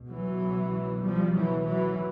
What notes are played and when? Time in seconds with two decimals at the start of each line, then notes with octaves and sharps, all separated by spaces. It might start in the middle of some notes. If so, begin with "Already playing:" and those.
Already playing: C#2 B2
0.09 E3 F#3
1.02 F3 G3
1.34 E3 F#3
1.65 E3 F#3